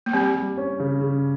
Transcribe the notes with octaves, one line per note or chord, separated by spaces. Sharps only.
A#3
G3 C4
G3
C#4
C#3
C#3